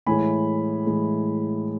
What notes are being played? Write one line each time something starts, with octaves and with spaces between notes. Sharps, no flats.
A2 E3 G#3 G#5 B5
A2 E3 G#3